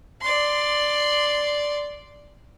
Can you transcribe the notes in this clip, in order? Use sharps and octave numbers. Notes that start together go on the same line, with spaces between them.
D5 C6